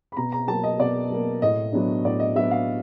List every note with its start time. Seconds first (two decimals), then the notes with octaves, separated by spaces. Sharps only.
0.12 B5
0.17 B2 A#5
0.32 A#5
0.48 F#3 A#3 A5
0.64 D#5
0.79 B2 D5
1.10 F#3 A#3
1.42 A2 D#5
1.73 F#3 B3 D4
2.05 A2 D5
2.20 D#5
2.36 F#3 B3 D4 E5
2.51 F5